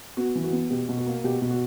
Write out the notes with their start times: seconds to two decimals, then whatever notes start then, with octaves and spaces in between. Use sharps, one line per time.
0.17 B3 F#4
0.35 E3
0.44 F#4
0.53 B3
0.70 B2 G4
0.89 B2
0.97 F#4
1.06 A#3
1.24 B2 G4
1.42 B2
1.51 F#4